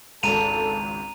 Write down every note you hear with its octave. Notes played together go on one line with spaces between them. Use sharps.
G#1 C#2 A4 A5 A#5 D#7 F7